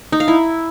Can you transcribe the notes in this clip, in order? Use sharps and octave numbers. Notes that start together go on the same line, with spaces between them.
D#4
F5
E4